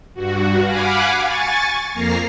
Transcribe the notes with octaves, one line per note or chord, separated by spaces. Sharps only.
G2 F#4
F5 F#5 G#5 B5 D6
G#5 C#6 A6
F2 A#3 A#5 A#6 C7